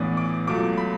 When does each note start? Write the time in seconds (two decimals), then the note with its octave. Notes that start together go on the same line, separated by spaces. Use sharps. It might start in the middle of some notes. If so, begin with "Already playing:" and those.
Already playing: A1 A2 E3 B3 D4
0.17 D6
0.47 C#2 B2 F#3 A3 D6
0.78 B5